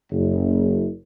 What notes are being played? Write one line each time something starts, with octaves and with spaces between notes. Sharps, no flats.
F#1